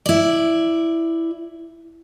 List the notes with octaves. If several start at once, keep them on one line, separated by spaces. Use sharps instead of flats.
E4 D5